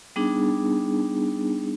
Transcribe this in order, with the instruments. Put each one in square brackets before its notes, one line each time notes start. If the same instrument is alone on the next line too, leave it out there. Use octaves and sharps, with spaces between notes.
[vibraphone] G3 B3 D4 D#4 G#4